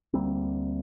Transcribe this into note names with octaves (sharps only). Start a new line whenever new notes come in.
D2 G3 A#3 C4